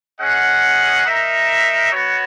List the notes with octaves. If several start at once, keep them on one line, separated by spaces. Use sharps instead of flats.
C#4 G#4 D#5 F#5
D#4 A#4 E5
B3 F#4 C#5